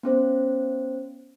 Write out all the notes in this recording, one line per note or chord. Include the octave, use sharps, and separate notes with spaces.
B3 C#4 C5